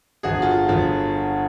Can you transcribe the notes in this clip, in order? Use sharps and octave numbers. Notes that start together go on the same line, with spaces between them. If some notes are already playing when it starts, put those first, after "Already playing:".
G1 F#4 G#4
F4
F#4
G1 F4